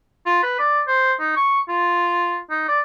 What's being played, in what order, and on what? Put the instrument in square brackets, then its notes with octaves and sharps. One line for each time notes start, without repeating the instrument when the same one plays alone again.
[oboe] F4
B4
D5
C5
D#4
C#6
F4
D#4
D5